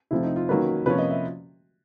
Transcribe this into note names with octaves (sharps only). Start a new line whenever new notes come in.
C3 F3 A3 C4 E4
D#4
F4
D#3 F#3 A#3 C#4 B4
C3 F3 A#3 C#4 B4
D#5
E5